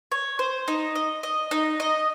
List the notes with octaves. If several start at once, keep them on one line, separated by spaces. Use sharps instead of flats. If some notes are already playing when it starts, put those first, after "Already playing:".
C#5
C5
D#4
D#5
D#5
D#4
D#5